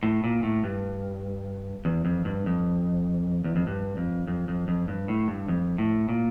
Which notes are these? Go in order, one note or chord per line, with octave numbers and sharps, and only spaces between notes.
A2
A#2
A2
G2
E2
F2
G2
F2
E2
F2
G2
F2
F2
F2
F2
G2
A2
G2
F2
A2
A#2